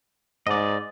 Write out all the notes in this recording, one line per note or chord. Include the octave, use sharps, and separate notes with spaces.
G#2 D5 D#5